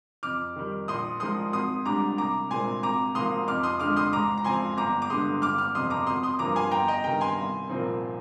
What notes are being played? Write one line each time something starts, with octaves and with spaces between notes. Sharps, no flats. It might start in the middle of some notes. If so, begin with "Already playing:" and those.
F2 D6 F6
D#3 G3
A#1 C6 D#6
A#2 F3 G#3 D#4 C6 D#6
G#1 C6 D#6
G#2 G3 D4 A#5 D6
C2 A#5 D6
A#2 G#3 C4 G#5 C6
G#1 A#5 D6
G#2 F3 A#3 D#4 C6 D#6
F2 D6 F6
C6 D#6
D3 G#3 D6 F6
C6 D#6
G#2 A#5 D6
A#5
F3 C4 G#5 C6
G1 A#5 D6
D6
G2 D3 G#3 C6 D#6
G1 D6 F6
D6 F6
F2 C3 F3 C6 D#6
A#5 D6
G#1 C6 D#6
C6 D#6
G2 F3 A#3 A#5 D6
G#5 C6
G1 G5 A#5
D#5 G5
G2 D#3 G5 A#5
G#5 C6
C2
A#2 F3 C4 D#4